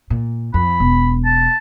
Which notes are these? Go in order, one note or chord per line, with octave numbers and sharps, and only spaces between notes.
A#2
F2 B5
E1
A5